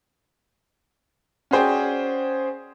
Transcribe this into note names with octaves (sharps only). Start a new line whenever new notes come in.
C#4 F#4 G#4 C5 D5 G5